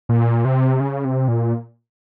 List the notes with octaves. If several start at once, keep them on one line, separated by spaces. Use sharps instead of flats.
A#2
C3
C#3
C3
A#2